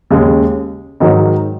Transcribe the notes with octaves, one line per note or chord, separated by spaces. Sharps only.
D#2 C#3 G#3
G#2 D#3 F#3 D#4